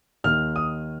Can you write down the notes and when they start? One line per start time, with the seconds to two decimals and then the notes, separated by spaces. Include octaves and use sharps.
0.24 D#2 D#3 F6
0.56 D#6